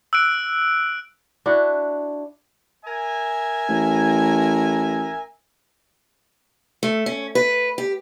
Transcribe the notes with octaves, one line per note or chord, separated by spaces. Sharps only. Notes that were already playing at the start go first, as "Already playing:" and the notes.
E6 F#6 D7
D4 E4 F#4
A#4 E5 G#5
A1
A3
C#4
B4
G4